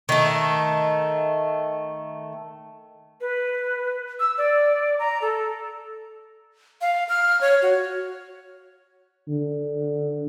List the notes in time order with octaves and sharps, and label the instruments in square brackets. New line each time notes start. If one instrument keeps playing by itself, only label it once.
[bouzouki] D#3 A3
[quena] B4
E6
D5
A#5
A4
[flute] F5
F6
C#5
F#4
[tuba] D3